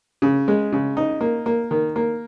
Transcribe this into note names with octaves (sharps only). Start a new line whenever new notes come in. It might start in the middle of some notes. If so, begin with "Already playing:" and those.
C#3
G#3
C#3
D#4
A#3
A#3
D#3
A#3